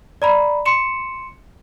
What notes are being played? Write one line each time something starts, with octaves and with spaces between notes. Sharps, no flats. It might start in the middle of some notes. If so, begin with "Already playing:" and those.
D5 A#5 B5
C6 C#7 E7